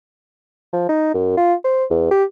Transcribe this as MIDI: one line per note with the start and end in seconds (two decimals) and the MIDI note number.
0.73 0.89 53
0.89 1.13 63
1.14 1.34 42
1.37 1.54 65
1.64 1.85 72
1.90 2.09 40
2.11 2.24 67